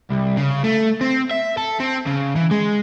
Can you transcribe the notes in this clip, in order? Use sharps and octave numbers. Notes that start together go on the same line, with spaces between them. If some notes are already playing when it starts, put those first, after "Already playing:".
C2
C#3
A3
C4
E5
A4
C4
C#3
E3
G#3